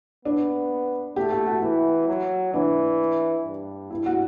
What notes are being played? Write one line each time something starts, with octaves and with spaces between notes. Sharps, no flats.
B3 D4
A3 G4
G4
F#4
E3 E4
F#3
E3 D4
G2
E4
F#4